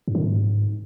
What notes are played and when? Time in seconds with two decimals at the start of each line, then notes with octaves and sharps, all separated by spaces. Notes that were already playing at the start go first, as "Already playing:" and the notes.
0.08 G2
0.15 D3
0.22 G#2